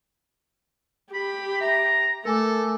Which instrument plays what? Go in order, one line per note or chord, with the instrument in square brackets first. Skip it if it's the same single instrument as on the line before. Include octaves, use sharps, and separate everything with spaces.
[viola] G4 [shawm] B5
[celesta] E5 [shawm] A#5
[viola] A3 [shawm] A4 [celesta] A#4 G#5 D6